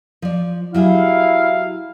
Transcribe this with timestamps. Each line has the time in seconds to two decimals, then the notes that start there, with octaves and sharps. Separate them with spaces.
0.22 F3 D5
0.74 F#3 E4 G4 G#4 F5